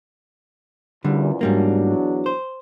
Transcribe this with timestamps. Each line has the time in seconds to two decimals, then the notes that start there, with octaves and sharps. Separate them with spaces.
1.04 A1 E2 A#2 D3 G3
1.41 E2 G#2 F#3 G3 A#3 D4
2.26 C5